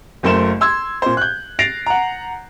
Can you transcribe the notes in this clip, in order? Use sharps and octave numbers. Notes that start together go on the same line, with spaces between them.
F#1 F#2 A3 A#4 C5 E7
C6 E6 G#6
A#2 C5
F#6 G6
A6 A#6 C7 D7 F7
F#5 A#5